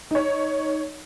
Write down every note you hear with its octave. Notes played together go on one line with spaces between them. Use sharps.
D#4 C#5